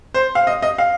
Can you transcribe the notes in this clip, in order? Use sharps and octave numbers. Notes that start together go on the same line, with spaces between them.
C5
F5
D#5
D#5
F5